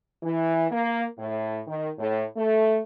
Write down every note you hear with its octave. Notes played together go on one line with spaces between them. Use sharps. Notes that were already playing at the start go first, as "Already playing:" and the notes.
E3
A#3
A2
D#3
A2
A3